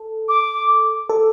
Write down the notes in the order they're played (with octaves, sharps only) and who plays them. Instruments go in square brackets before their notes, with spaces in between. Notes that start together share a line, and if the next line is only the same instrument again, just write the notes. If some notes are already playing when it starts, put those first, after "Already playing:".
Already playing: [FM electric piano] A4
[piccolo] D6
[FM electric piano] A4